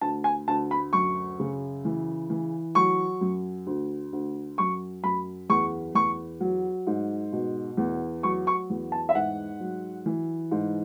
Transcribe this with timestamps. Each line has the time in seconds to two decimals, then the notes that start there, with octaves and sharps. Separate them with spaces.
0.01 D2 A5
0.24 G#5
0.48 D2 A5
0.71 B5
0.93 F#2 C#6
1.40 C#3
1.85 E3
2.30 E3
2.75 F#3 C#6
3.21 F#2
3.67 D2
4.13 D2
4.58 F#2 C#6
5.04 F#2 B5
5.49 E2 C#6
5.95 E2 C#6
6.40 F#3
6.87 G#2
7.32 B2
7.77 E2
8.23 F#3 C#6
8.47 C#6
8.70 E2
8.92 A5
9.09 E5
9.15 G#2 F#5
9.60 F#3
10.06 E3
10.51 G#2